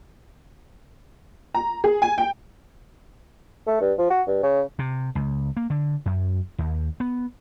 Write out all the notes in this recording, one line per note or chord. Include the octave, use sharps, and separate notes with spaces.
A#5
G#4
G#5
G5
A3
G2
F3
F#4
G2
C#3
C3
C#2
A#3
D3
F#2
D#2
B3